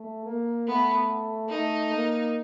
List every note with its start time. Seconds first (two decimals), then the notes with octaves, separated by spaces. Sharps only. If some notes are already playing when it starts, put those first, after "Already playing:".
Already playing: A3
0.26 A#3
0.67 A3 B3
1.49 A3 D#4
1.91 A#3